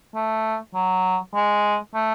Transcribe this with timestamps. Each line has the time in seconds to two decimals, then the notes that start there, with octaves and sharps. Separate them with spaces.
0.15 A3
0.75 F#3
1.35 G#3
1.94 A3